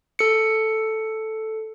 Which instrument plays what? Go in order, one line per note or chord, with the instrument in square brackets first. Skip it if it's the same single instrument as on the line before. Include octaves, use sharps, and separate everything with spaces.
[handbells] A4 C#7